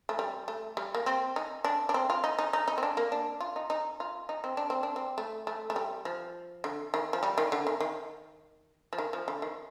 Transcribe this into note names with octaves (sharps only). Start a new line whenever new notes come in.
A3
G3
A3
G3
A#3
C4
D#4
D4
D4
C4
F4
D#4
D#4
D#4
D#4
C4
D4
A#3
D4
F4
D#4
D#4
F4
D#4
C4
D4
C4
D4
C4
A3
A3
A3
G3
F3
D3
D#3
F3
G3
D#3
D3
D#3
D#3
F3
D#3
F3
D3
D#3